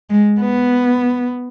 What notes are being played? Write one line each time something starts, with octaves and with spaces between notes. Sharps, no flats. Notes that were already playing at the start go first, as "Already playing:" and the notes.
G#3
B3